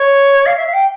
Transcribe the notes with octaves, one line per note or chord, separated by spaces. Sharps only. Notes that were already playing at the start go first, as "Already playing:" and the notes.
Already playing: C#5
F5
E5
F5
G5